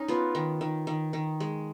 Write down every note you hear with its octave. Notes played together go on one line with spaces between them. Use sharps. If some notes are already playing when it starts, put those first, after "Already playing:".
Already playing: C#4 D#4
B3 F4
D#3
D#3
D#3
D#3
G#3